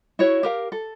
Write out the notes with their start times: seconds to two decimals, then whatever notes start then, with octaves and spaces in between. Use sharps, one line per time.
0.19 E4 F#4 C#5
0.43 G4 A#4 F5
0.72 A4